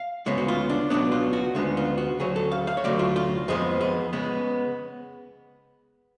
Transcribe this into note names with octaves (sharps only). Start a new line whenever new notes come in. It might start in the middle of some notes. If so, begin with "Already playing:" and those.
Already playing: F5
D2 C#3 G#3 B3 C#5
F#4
F4
D4
C#2 B2 F#3 B3 D4
F4
F#4
D2 C#3 G#3 B3 D4
F4
F#4
D2 C#3 F#3 G#4
A4
F5
F5
C#5
D2 C#3 F#3 A3 D5
F4
F4
F2 F3 G#3 B3 G#4
G#4
C#3 G#3 B3